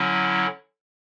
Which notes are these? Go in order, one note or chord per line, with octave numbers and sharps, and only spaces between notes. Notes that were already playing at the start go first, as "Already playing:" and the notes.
Already playing: D3 F#3 C#4 E4